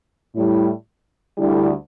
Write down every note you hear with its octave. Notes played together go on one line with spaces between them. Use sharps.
A2 G3 E4
D2 D3 G3 E4